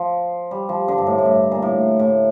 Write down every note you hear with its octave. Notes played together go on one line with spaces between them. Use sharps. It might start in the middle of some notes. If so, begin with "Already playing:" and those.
Already playing: F3
G3
F3
D3
G2
A2
A2
G2
A#2
A2
A2